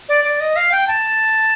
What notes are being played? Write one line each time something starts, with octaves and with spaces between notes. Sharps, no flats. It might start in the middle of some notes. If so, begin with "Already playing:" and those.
D5
D5
D#5
F5
G5
A5